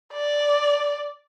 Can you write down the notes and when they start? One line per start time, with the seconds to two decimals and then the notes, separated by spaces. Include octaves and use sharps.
0.13 D5